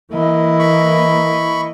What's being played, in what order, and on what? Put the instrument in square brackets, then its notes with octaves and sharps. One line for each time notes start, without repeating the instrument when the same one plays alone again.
[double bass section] E3 A#3 [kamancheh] E4 D#5
[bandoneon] B5 C#6